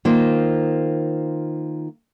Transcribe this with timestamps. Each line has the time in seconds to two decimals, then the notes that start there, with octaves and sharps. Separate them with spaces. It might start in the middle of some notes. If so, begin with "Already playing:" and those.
0.05 D#3 A#3 F4 C5